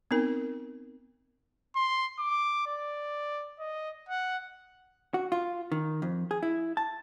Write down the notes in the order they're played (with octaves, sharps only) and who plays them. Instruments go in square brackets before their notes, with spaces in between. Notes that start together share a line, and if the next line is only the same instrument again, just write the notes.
[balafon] B3 C4 D#4 A#4
[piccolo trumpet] C6
D6
D5
D#5
F#5
[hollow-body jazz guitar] F#4
F4
D#3
F2
G#4
E4
A5